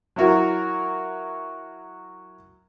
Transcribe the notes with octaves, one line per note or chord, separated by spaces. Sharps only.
F#3 E4 F#4 A#4